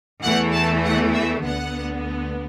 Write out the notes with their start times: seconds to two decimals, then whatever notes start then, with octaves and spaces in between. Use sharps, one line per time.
0.24 E2 E3 A3 F#5
0.54 A5
0.84 F#5
1.14 E5
1.44 D2 D3 B3 F#5